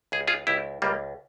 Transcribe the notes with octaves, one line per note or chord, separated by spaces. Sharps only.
C#2 G#4
F4 G#4
C#2 E4 G4
C#2 G3 A#3